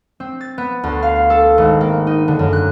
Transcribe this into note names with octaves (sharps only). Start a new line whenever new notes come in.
C4
A6
B3
D2
F5
A4
G#1
A#3
D#4
D3
F#2
F#6